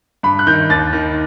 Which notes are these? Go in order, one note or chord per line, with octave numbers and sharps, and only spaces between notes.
G2 B5
F#6
D#3 G6
D#2 A6
D#3